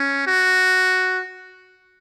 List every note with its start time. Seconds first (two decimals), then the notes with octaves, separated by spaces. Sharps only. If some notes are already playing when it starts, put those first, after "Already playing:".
Already playing: C#4
0.27 F#4